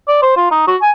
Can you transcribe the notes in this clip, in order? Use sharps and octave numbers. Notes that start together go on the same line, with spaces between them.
D5
C5
F4
D#4
F#4
G#5